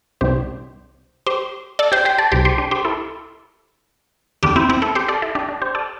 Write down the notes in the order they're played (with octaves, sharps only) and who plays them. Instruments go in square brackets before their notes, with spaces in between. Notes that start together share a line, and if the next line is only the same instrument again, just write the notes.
[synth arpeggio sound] C2 C3 E3 G3 G4 C5
G4 C5
A4 D5
G4 C5
G4 C5
A4 D5
C2 C3 G3 G4 C5
G4 C5
D4 G4
G4 C5
E4 A4
E2 D3 G3 D4 G4
C4 E4
C4 E4
E4 A4
G4 C5
A4 D5
E4 A4
D4 G4
D4
G4 C5
A4 D5